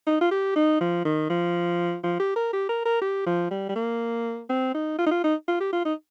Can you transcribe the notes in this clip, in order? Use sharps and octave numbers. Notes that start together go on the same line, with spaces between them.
D#4
F4
G4
D#4
F3
D#3
F3
F3
G4
A#4
G4
A#4
A#4
G4
F3
G3
G3
A#3
C4
D#4
F4
D#4
F4
D#4
F4
G4
F4
D#4